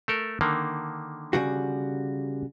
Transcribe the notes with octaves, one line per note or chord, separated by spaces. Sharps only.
A3 A4 A#4
D3 D#3 A#3
C#3 G3 F#4